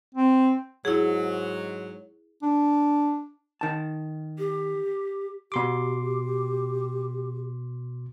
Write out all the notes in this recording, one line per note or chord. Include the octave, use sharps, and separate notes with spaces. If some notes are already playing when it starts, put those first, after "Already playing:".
C4
G#2 F#3 E4 G#4
D4
D#3 A5
G4
B2 G4 C6 D6